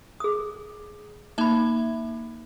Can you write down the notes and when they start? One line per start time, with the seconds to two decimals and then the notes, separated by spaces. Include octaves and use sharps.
0.20 G#4 D#6
1.38 A#3 D#4 E5 B5